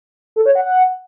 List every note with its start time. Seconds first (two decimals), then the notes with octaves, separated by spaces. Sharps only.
0.36 A4
0.46 C#5
0.55 F#5
0.65 F#5